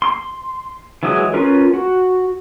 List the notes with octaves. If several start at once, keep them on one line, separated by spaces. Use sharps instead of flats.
C6
E3 F#3 G#3 D#6
C#4 F4 A#4 B4
F#4